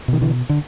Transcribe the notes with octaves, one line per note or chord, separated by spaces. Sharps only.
B2 D#3
D3 E3
D3